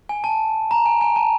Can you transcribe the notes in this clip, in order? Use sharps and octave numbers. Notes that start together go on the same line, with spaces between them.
G#5
A5
A#5
G#5
G#5
A5